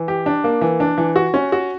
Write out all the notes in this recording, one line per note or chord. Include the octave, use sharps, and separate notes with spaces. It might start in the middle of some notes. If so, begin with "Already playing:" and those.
Already playing: E3
G4
D4
A#3
E3
D4
E3
F#4
C#4
F#4